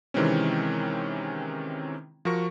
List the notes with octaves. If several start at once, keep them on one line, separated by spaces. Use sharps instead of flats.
C3 D#3 E3 G#3 C4 C#4
F3 F#4 A#4 C#6